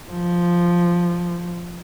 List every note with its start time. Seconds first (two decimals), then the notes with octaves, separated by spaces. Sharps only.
0.11 F3